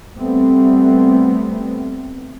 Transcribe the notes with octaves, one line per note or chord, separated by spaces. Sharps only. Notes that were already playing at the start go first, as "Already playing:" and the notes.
G3 A3 B3 C4